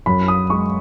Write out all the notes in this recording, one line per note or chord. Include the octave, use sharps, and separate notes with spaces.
F#2 B5
D#6
G#3 C#6